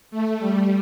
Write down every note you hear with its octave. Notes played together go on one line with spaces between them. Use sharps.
A3
G3